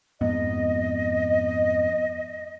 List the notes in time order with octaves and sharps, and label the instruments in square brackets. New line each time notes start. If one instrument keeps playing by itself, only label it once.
[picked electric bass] F2 G#2 B3 [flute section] D#5